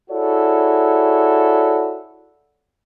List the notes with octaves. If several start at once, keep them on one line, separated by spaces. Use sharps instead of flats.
E4 F#4 G#4 A4 C#5 D5